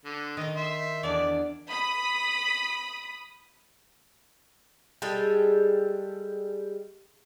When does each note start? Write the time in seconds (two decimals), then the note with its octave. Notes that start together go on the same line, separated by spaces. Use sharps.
0.05 D3
0.37 D#3 D#4 D#5
0.56 E5 C6
1.03 E2 D4 D5
1.71 B5 D#6
5.02 G3 G#3 G#4 A4